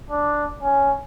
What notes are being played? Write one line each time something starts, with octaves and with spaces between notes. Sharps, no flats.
D4
C#4